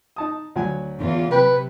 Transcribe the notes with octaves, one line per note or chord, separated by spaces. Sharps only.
D#4 A5 D#6
D2 F#3 G#5
E2 F4
C3 F#3 B4 G5